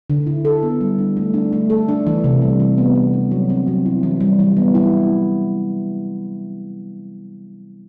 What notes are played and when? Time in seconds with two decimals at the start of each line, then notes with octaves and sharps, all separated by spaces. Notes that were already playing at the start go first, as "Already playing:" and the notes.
0.10 D3
0.27 E4
0.45 A4
0.63 B3
0.81 G3
0.99 D4
1.17 A3
1.34 D4
1.53 A3
1.70 A4
1.88 D4
2.07 E3
2.24 C3
2.42 G3
2.60 E3
2.78 B3
2.96 E3
3.13 D4
3.31 F#3
3.49 C4
3.67 F#3
3.86 E4
4.03 E3
4.20 G3
4.39 E3
4.57 B3
4.75 E4